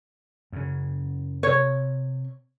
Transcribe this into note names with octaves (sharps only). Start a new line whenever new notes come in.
F#2 C#3
C3 C#5